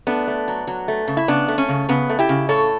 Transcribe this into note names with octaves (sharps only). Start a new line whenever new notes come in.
A3 B3 D4
A3
F#3
F#3
A3
C#3
E4
C#3 B3 D4
A3
C#4
C#3
C#3 B3
A3
E4 G4
C#3
A2 A4 C#5